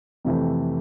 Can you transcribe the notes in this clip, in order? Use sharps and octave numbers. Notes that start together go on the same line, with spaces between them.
F2 C3 E3 A3